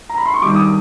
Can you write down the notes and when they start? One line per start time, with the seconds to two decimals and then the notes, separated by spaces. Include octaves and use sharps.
0.09 A#5
0.18 B5
0.25 C6
0.34 C#6
0.42 G2 D#3 G3 D6
0.54 D#6